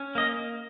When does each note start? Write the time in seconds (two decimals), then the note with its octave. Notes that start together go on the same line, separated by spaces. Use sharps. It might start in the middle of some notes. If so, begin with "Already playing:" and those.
Already playing: C#4
0.15 A#3 D#5